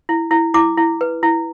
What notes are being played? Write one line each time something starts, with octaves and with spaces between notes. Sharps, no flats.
E4
E4
E4 D6
E4
B4
E4